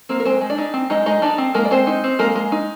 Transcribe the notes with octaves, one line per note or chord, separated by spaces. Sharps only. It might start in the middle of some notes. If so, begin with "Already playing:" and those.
A#3 C4 A#4
A#4
G#3 C4 C5
G#3
D4 D5
D#4
C4
G#3 D#4 D#5
G#3 D#4 D#5
D4 D#4 D5
C4
G#3 A#3 A#4
D5
G#3 C4 C5
D#4
C4
G#3 A#3 A#4
G#3
D#4